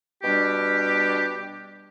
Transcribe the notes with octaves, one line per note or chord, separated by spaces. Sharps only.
B2 G3 D4 G4